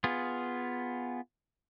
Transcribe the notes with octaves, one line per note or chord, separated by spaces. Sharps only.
B3 F4 G#4